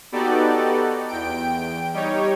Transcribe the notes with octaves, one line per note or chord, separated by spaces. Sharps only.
B3 D#4 F#4 G4 A4 D5
E2 G5 D7
G3 D#4 G4 C#5